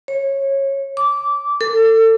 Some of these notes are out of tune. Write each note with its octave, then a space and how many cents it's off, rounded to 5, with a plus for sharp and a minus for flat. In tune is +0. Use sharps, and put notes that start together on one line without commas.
C#5 -20
D6 -15
A4 +30